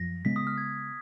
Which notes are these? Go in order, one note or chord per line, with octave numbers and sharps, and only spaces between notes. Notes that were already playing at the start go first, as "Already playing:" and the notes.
Already playing: F#2 F3 A#6
C#3 G#3 B3 B6
D#6
F6
G#6